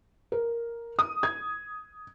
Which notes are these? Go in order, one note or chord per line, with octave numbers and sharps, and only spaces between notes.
A#4
D#6
G#6